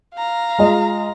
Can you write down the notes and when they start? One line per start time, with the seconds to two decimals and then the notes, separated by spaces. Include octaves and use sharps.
0.16 F5 A#5
0.59 G#3 F4 D#5